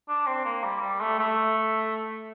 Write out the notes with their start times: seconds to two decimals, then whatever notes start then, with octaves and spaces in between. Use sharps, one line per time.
0.09 D4
0.27 C4
0.45 A#3
0.63 G3
0.81 G3
1.01 A3
1.19 A3